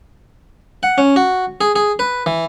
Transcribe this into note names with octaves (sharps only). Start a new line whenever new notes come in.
F#5
C#4
F#4
G#4
G#4
B4
E3